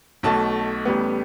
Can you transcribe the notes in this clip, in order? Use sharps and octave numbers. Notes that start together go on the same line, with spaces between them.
B1 B2 A3 A5
A1 A2 G3 B3